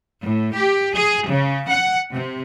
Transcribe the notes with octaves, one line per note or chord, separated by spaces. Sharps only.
A2
G4
G#4
C#3
F#5
C3